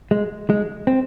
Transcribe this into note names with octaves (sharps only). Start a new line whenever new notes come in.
G#3
G#3
C4